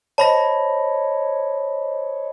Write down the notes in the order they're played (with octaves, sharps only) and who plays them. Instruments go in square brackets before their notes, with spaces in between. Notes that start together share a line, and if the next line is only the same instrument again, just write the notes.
[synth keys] C5 C#5 D#5 [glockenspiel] A5 B5 A#6